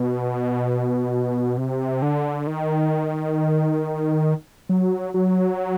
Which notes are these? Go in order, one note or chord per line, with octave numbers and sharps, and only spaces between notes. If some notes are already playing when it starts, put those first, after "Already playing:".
Already playing: B2
C3
D3
D#3
F#3
F#3